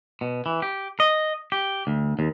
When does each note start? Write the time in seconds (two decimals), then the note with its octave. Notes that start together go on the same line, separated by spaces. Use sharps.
0.21 B2
0.46 E3
0.62 G4
1.00 D#5
1.52 G4
1.87 D2
2.19 D#2